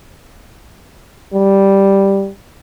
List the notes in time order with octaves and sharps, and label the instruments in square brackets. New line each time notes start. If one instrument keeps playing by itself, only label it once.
[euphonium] G3